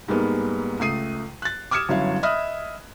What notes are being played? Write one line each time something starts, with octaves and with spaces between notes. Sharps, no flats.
G#2 G3 G#3 A#3 B3
C#2 A3 D#6 C7 D#7
F#6 A6
D6 D#6 F6 G#6 C#7 E7
G1 F#2 F#3 E4 C#5 F5
D#5 E5 B5 D#6 F6 F#6